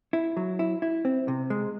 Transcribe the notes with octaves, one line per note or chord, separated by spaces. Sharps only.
E4
F#3
E4
E4
C4
C3
G#3